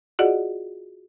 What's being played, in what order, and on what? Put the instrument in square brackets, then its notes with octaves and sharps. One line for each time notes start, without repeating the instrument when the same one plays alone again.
[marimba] F4 F#4 G#4 D5 D#5 F#5